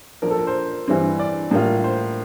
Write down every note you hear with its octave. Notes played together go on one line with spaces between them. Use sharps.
A#2 F3 A#3 D4 A#4
A4
A#4
C5
G2 E3 G3 C4
D5
A2 G3 A#3 F4
C5